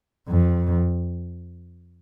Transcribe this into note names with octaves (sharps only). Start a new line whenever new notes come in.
F2